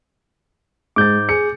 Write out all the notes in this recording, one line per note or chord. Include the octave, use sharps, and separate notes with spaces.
G#2 G#3 D6 G6 A6
G#4 C#7